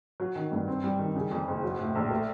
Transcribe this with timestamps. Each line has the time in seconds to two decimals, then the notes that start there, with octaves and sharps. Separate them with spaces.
0.20 F#3
0.35 D#3
0.52 G2
0.68 C4
0.84 G3
0.99 D#3
1.15 C#3
1.31 F2
1.48 F#1
1.63 F#3
1.79 A2
1.95 A#1
2.10 A3